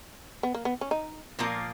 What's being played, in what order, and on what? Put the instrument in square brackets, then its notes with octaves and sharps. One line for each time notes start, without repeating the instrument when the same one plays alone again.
[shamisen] B3
A#3
B3
C#4
D#4
[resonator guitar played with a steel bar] A#2 F3 A#3 F4 A#4